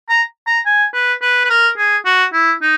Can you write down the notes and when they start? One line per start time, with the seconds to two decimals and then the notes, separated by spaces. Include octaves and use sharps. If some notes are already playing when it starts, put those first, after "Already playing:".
0.09 A#5
0.47 A#5
0.66 G#5
0.94 B4
1.22 B4
1.44 B4
1.50 A#4
1.77 G#4
2.05 F#4
2.33 E4
2.62 D#4